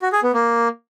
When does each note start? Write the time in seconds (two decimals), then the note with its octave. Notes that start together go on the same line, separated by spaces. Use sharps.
0.02 F#4
0.13 G#4
0.23 B3
0.34 A#3